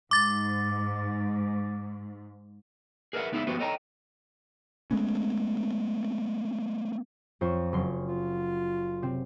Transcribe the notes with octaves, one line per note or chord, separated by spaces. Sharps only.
G#2 D6 A6
G#4 A#4 B4 C#5 E5 F#5
C#2 B3 D#4 E4 G#4 E5
F3 B3 F#4 G4 B4 C5
A4 C#5 D#5 G5 A5 A#5
G#3 A3 B3 C#4
F2 C5 C#6
F#1 C6
F4
C3 C4